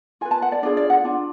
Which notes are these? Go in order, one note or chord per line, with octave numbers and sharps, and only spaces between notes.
F4 B4 G#5
A5
F#5
D5
D4 F4 G#4 D5
D5
F#5
D4 F4